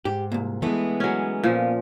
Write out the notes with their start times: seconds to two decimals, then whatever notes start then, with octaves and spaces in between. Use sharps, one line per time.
0.05 G#2 G4
0.32 C2 A#2
0.62 E3 G#3 A3 B3
1.00 F#3 C#4
1.44 A#2 F3